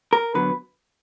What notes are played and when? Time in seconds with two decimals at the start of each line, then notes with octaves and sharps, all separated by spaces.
0.13 A#4
0.34 D3 F#3 B3 B4